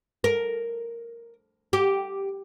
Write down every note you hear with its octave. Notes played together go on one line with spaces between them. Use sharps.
A#4
G4